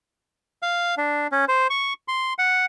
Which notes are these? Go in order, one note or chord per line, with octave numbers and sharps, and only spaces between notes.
F5
D4
C#4
C5
C#6
C6
F#5